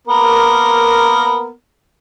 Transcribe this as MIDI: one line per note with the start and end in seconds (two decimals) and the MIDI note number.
0.07 1.51 58
0.07 1.51 59
0.07 1.51 70